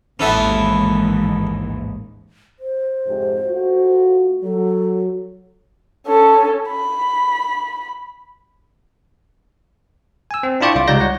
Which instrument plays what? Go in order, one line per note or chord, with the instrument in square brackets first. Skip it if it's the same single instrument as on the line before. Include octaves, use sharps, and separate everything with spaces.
[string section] A1 D#2 G#2 [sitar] E3 B3 [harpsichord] C#4 A4 E5
[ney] C5
[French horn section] F2 G#2 C3
A3 F4 F#4
[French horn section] F#3 [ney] A4
[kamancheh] C#4 A4
B5
[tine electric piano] G#5 E6
C4
D4 E4 F4 D5 G5 C#6
C2 F4 D6
C#2 G3 D#4 D5 G6 A#6
C#5 F#5